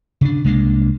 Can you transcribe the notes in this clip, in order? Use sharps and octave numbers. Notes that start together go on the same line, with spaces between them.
C#3 D4
C2 G#3 A#3 D4